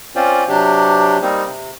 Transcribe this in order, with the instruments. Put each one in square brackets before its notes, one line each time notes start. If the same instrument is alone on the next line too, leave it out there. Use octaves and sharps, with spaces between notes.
[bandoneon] C4 C#4 F4 C5 D5
C3 F#3 D4 G4
G3 A#3 C4 D#4
C3